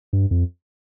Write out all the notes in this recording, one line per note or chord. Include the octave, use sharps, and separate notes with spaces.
G2
F2